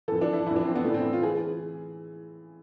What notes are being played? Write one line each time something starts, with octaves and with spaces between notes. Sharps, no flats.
F2 E3 A4
D4
E4
F2 E3 E4
D4
C4
B3
A2 E3 A3
C4
F4
E3 G#4